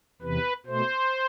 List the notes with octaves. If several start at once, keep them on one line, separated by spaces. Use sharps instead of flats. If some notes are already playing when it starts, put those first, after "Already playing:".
E2 C3 E3 B4
B2 A3 C5